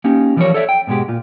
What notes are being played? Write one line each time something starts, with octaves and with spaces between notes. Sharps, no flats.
A#3 C#4 D#4 G4
E3 F3 G3 G4 A#4 C#5
A4 C#5 D5 E5
G5
G#2 B2 G#3 G4
A#2 F4